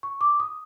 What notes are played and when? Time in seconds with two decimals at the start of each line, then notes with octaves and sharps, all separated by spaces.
0.03 C#6
0.21 D6
0.40 D#6